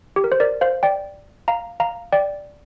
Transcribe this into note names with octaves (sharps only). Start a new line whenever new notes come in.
G4
A#4
C5
A#4 D5
C5 F5
D5 G5
F5 A#5
F5 A#5
D5 G5